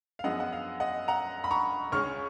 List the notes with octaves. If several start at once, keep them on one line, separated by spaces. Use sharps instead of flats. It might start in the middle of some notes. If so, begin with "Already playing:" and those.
F5
F#2 F3 G#3 B3 D#5 F#5
F#5
F5
D#5 F#5
F#5 A#5
B5
A#5 C#6
C#2 C#3 G#3 C#4 C#6 F6